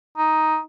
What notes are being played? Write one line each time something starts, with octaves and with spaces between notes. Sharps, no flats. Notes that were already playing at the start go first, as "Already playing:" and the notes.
D#4